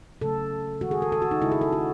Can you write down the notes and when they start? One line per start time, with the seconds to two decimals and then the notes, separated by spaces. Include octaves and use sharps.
0.21 C#3 F#3 A3 A4
0.81 D#3 G#3 F#4
0.91 G#4
1.02 A4
1.12 A4
1.22 F#4
1.31 D#4
1.42 C#3 G#3 E4
1.52 G#4
1.61 A4
1.73 F#4